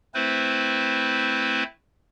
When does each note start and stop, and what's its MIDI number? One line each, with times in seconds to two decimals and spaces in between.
0.14 1.63 57
0.14 1.63 60
0.14 1.63 64
0.14 1.63 71
0.14 1.63 72